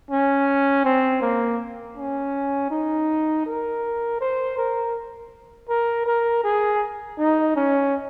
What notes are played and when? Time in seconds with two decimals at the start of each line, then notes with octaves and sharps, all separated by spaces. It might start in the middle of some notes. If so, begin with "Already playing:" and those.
0.11 C#4
0.85 C4
1.22 A#3
1.97 C#4
2.71 D#4
3.46 A#4
4.20 C5
4.58 A#4
5.69 A#4
6.06 A#4
6.44 G#4
7.19 D#4
7.56 C#4